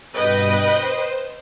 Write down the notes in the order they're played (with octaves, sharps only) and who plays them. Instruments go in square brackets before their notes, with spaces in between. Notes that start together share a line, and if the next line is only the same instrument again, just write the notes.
[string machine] G2 B2 [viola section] B4 D#5 G5
[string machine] C5